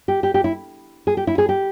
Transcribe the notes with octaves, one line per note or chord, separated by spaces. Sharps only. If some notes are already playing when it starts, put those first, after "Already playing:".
G4
G4
G4
E4
G#4
G4
E4
G#4
G4